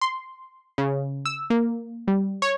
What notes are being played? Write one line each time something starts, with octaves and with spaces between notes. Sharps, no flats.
C6
C#3
E6
A#3
G3
C#5